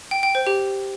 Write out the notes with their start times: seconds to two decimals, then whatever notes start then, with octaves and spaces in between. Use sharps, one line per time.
0.11 G5
0.23 G5
0.35 C5
0.47 G4